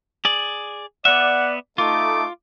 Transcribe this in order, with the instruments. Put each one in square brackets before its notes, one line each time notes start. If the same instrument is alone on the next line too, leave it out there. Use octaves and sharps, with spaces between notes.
[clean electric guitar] G#4 D5
[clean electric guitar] B3 E5 [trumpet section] D5 [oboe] F#5
[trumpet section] A3 D#4 [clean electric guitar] F4 [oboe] D6